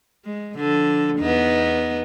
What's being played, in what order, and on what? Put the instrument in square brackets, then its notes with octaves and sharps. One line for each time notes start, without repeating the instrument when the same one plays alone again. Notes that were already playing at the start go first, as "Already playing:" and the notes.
[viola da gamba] G#3
D3 F3 A4
E2 B3 D#4